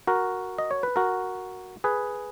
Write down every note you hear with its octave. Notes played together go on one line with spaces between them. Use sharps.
F#4 A#4
D#5
C#5
B4
F#4 A#4
G#4 B4